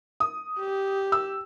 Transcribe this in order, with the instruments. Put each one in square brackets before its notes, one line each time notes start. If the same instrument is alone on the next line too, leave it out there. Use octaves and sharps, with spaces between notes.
[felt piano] D#6
[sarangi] G4
[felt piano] E6